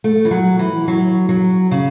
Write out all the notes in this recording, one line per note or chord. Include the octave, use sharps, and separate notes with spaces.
A3
E3
F#3
E3
F#3
F#3
C#3